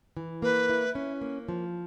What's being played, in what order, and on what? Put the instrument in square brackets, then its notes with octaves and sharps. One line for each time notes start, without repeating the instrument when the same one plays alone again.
[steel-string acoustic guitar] E3
[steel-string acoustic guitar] A#3 [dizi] B4
[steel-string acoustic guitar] E4
C#4
A#3
F3